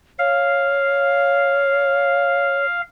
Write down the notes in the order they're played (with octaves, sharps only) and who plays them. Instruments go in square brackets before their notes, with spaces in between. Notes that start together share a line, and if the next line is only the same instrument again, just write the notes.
[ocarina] C#5 [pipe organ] F5